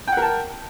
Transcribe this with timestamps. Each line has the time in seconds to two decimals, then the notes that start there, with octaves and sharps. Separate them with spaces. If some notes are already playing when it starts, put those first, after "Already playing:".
0.07 G5
0.12 F#5
0.17 A#4
0.22 A5